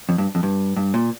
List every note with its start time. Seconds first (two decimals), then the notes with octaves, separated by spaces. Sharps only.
0.09 F2
0.18 G2
0.35 F2
0.43 G2
0.76 G2
0.94 A#2